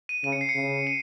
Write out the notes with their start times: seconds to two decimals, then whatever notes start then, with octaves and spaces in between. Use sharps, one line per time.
0.09 D#7
0.24 C#3 D#7
0.32 C#7
0.41 C7
0.49 C#7
0.55 C#3
0.87 D#7